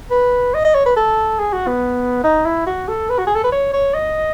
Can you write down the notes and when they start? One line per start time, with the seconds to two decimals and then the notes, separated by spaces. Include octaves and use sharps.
0.11 B4
0.54 D#5
0.65 D#5
0.75 C#5
0.86 B4
0.96 A4
1.39 G#4
1.53 F#4
1.67 B3
2.24 D#4
2.45 E4
2.66 F#4
2.88 A4
3.09 B4
3.18 F#4
3.27 G#4
3.35 A4
3.44 B4
3.52 C#5
3.73 C#5
3.94 D#5